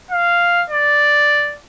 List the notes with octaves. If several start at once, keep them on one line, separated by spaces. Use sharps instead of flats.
F5
D5